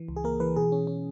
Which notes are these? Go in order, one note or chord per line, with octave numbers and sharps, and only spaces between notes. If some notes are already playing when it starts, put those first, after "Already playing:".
Already playing: E3
C#2
G#4
A#3 A#4
E3 B4
B2 G#4
C#4
C#4